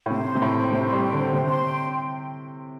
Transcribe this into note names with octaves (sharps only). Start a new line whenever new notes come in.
A2
C3 C5
C6
C3
A2 G5
C5
C3 C5
G3 C6
G5
D3 C5
C3 C5
C6
G5